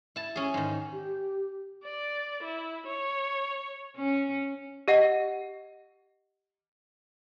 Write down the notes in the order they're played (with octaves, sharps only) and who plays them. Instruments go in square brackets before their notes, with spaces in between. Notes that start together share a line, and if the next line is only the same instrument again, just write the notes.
[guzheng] E4 A5
C#4 G#4
G#2 D#3
[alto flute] G4
[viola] D5
E4
C#5
[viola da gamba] C#4
[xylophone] G4 D#5 F#5